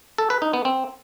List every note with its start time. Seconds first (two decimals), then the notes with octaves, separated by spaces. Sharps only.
0.18 A4
0.30 B4
0.42 D#4
0.53 B3
0.65 C4